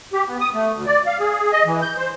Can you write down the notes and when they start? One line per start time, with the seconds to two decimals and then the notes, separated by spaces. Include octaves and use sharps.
0.13 G4
0.28 B3
0.40 D#6
0.54 A3
0.73 D2
0.86 D5
1.07 F5
1.19 G#4
1.52 D#5
1.66 E3
1.82 G6
1.97 C5